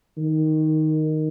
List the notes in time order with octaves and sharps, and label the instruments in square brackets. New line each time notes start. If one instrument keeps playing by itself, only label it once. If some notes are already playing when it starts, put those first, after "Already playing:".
[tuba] D#3